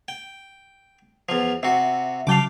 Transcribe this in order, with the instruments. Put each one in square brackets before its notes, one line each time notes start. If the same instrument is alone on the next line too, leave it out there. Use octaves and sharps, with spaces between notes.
[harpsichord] G5
E2 F3
[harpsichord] C3 F#4 [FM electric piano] E5
[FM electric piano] C#3 F#3 A5 [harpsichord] F5 G5 D6